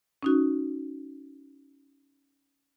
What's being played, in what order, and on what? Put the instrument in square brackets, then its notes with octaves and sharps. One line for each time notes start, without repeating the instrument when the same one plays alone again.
[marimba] C#4 D#4 F#4